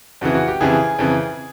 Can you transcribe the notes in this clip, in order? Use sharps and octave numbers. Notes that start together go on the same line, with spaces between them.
F2 C#3 E3 F#4
F#4
G4
F2 C#3 E3 G#4
F2 C#3 E3